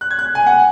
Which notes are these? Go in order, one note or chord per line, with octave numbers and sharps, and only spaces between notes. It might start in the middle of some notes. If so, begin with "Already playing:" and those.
F#6
G#6
F#6
G#5
F#5